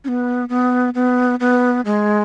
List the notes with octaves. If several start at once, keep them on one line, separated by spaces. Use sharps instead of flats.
C#4
B3
B3
B3
B3
G#3